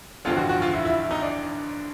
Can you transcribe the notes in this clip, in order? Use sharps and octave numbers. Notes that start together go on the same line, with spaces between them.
A1 G2 D3 F3 F4
F#4
F#4
F4
E4
E4
D#4
D4